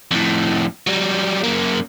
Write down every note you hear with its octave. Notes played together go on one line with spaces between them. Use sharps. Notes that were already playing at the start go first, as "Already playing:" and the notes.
F2 A2
F#3 G3
F#2 A#3